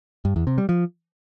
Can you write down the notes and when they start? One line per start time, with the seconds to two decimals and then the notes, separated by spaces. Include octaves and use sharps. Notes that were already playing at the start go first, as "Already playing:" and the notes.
0.25 G2
0.36 E2
0.47 C3
0.58 G3
0.69 F3